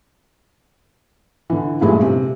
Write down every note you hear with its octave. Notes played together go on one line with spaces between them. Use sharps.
D3 E3
G2 A#2 E3 G#3 A3 E4
C3